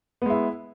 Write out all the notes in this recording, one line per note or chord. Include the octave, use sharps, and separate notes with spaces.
G#3 B3 E4